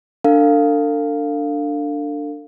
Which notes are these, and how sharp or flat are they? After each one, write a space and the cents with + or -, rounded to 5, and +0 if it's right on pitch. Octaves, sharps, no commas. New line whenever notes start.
D4 +0 A4 +45 F5 +0